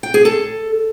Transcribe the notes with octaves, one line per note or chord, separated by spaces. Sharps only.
G5
G#4
A4